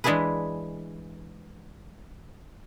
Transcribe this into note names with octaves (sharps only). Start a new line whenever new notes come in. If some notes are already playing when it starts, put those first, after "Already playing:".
E3 G#3 D4 E4 G#4 B4